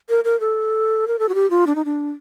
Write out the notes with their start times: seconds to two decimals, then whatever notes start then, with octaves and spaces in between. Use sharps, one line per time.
0.09 A#4
0.24 A#4
0.40 A4
1.08 A#4
1.19 A4
1.29 F#4
1.35 G4
1.50 F4
1.67 D4
1.76 D#4
1.85 D4